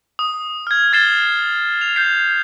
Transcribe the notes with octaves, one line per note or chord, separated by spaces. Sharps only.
D#6
F6 G#6
F6 A6 C7 E7 G7
F7
G6 C7